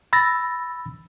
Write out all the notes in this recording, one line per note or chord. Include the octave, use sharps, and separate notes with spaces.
B5 E6 A6 A#6